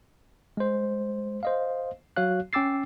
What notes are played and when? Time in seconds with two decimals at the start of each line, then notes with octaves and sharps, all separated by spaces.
0.57 G#3 C5
1.43 C5 D#5 F5
2.16 F#3 F#4 C#5 F5 F#6
2.53 C#4 G5 D6 E6 A6 C7